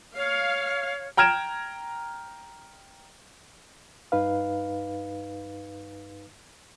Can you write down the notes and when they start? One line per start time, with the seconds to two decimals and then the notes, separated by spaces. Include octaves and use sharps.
0.16 C#5 F5
1.17 G5 A#5 F6 G#6 D7 E7
4.12 G2 D#4 B4 F5